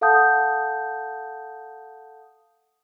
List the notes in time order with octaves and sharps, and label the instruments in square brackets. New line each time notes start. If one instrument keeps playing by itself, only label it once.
[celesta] A4 F5 F#5 A5 D#6 G6